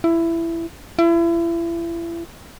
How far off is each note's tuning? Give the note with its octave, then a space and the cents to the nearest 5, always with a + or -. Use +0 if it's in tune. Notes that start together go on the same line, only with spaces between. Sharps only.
E4 +15
E4 +35